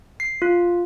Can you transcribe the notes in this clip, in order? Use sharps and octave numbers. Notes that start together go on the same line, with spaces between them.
C7
F4